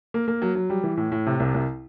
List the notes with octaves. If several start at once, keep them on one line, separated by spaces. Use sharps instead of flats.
A#3
A#3
F#3
F#3
G3
E3
A2
A2
C3
C2
C2